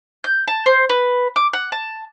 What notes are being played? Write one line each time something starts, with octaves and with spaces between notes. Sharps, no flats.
G6
A5
C5
B4
D6
F#5
A5